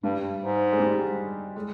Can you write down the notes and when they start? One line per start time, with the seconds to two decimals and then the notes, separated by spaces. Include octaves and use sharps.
0.03 G2 G3
0.41 G#2
0.72 G#3
0.80 G3
1.56 G#3